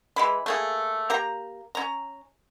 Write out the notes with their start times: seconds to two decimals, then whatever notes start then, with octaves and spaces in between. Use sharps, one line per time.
0.16 E3 G#3 B5
0.46 A3 A#3 G#4
1.10 A#3 G4 A#5
1.75 C#4 A#5